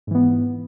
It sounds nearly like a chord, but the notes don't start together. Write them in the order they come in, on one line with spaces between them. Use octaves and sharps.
G#2 E3 B3